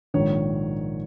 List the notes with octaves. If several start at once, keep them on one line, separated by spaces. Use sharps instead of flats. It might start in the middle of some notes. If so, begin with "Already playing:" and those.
A#1 G#2 D#3 C#5